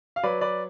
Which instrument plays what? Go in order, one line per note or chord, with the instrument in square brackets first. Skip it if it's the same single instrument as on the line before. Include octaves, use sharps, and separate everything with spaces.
[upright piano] F5
F#3 B4 D5
B4 D5